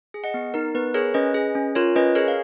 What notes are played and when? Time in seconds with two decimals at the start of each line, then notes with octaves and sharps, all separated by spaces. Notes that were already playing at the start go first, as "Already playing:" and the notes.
0.14 G#4
0.24 D#5 F#5
0.34 B3
0.54 D#4 A#4
0.75 B3 B4
0.94 G#4 A#4 C#5
1.14 C#4 B4 D#5
1.34 G#4
1.55 C#4
1.75 F4 A#4 C#5
1.96 C#4 B4 D#5
2.15 G#4 A#4 C#5
2.28 F5